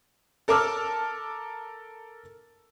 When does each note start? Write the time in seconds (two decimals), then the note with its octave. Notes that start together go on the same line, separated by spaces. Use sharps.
0.48 A4 A#4 A5 D6 E6 F6